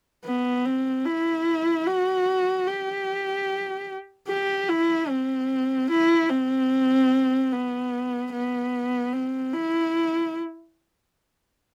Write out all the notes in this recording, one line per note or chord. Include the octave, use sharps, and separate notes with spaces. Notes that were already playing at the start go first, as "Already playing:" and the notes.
B3
C4
E4
F#4
G4
G4
E4
C4
E4
C4
B3
B3
C4
E4